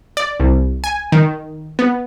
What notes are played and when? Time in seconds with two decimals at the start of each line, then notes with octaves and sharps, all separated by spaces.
0.17 D5
0.40 C2
0.84 G#5
1.12 D#3
1.79 B3